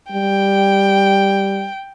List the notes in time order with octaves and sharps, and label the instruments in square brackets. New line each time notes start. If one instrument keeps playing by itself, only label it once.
[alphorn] G3 [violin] G5